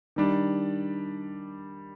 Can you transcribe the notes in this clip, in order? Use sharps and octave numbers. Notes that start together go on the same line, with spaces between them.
D#3 G3 D4